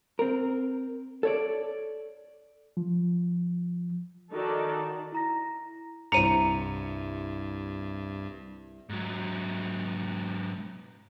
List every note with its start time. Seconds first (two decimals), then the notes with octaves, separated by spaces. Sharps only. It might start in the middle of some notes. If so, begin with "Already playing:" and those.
0.19 C4 A#4
1.23 A4 C#5 D5
2.77 F3
4.31 D#3 D#4 F#4 A4 D5
5.12 E4 A#5 A#6
6.12 C2 G2 C5 A#5 C#7 D#7
8.89 G#2 F#3